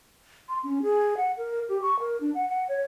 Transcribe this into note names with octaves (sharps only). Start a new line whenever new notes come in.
C6
C#4
G#4
F#5
A#4
G4
C#6
A#4
D4
F#5
F#5
C#5